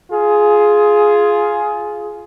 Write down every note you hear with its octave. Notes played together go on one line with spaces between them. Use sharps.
F4 G#4